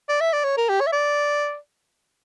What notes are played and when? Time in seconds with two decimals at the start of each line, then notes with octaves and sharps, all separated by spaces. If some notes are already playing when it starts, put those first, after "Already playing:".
0.09 D5
0.21 E5
0.33 D5
0.44 C#5
0.57 A#4
0.69 G4
0.80 C#5
0.87 E5
0.92 D5